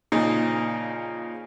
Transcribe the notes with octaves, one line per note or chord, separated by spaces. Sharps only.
A#2 C#3 F3 D#4